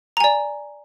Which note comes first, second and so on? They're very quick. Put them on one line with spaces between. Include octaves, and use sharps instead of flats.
A#5 G#5 D5